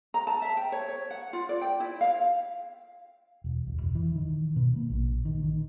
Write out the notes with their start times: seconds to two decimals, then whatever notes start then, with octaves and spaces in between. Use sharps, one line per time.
0.14 A#5
0.27 A5
0.42 E5
0.57 G5
0.72 C#5
0.88 C#5
1.11 F#5
1.33 F4
1.49 D5
1.61 G5
1.80 E4
2.01 F5
3.44 E1
3.67 D#1
3.82 F1
3.95 E3
4.15 D#3
4.56 B2
4.76 A#3
4.90 A#1
5.25 D#3
5.44 D#3